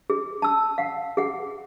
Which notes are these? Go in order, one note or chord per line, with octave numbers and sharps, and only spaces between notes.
G#4
A5 E6
F5 F#5
G#4 F#5